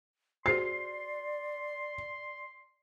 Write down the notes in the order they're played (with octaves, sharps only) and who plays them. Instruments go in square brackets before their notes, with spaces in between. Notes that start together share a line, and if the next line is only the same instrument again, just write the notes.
[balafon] F#4 G#4 C5 [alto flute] D5 [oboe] C6 [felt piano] C7